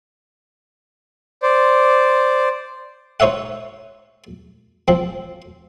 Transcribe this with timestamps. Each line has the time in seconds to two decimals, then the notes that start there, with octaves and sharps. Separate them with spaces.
1.42 C5 D5
3.20 D#4 C5 C#5 E5 F#5
4.88 F3 C4